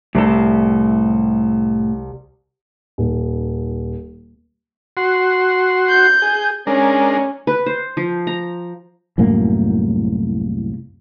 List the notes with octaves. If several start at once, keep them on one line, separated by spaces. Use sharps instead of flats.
C2 A2 A4 C7
D#1
F#4 C6
G6
G#4
G#3 C#4 D4 A#4
B4
C5
F3
A#5
C2 F#2 A2 A#3